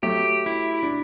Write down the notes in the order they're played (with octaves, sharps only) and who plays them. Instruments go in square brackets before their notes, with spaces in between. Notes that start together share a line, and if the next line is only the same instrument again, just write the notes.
[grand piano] F#3 A3 [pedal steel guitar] G4
[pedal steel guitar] E4
[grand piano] D4